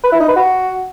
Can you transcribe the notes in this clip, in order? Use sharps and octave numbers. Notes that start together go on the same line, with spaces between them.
B4
E4
D#4
B4
F#4